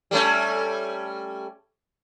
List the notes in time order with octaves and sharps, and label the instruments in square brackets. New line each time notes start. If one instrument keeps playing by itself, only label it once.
[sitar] G3 A3 C#4